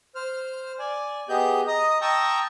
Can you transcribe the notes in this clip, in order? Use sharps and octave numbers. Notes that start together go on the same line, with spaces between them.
C5 F6
D5 G#5
B3 G4 G#4 D#5 G6
D#5 A#5 D#6
G5 A5 A#5 C#6 D#6 E6